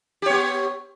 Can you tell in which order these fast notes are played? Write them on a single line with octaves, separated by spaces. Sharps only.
G4 C#5 B3